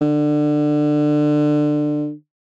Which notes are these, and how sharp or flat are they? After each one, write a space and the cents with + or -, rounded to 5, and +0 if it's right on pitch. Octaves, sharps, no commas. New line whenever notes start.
D3 +20